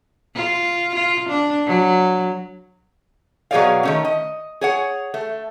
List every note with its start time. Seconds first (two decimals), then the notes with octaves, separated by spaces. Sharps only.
0.35 F4
0.95 F4
1.29 D4
1.67 F#3
3.51 B2 F#3 G#4 C#5 D5 F5
3.83 D#3 A3 C#4
4.05 D#5
4.61 G#4 C#5 F#5
5.14 A3